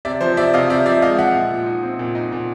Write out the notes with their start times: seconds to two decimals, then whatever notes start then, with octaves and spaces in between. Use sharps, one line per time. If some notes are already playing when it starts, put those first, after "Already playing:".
0.05 C3 D5 E5
0.21 F3 C5
0.37 C3 D5 E5
0.54 C3 D#5 F5
0.70 C3 D5 E5
0.86 F3 D5 E5
1.02 G#3 D#5 F5
1.18 F3 E5 F#5
1.34 A#2
1.50 A#2
1.66 D#4
1.83 C4
1.99 A#2
2.15 D#4
2.32 A#2